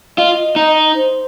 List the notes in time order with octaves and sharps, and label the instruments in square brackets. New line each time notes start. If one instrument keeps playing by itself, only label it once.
[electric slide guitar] F4 [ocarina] D#5
[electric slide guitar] D#4
[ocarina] C5